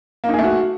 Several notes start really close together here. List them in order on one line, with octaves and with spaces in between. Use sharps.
A#3 D#4 G#4 A3 F#4